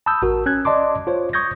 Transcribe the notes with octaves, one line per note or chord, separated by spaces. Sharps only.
A5 B5 D#6 E6 G6
A1 F#4 A#4
C#4 F#6 G#6
D5 D#5 A5 C6 D6
F4 C5 C#5
C#6 D#6 G6 G#6 A#6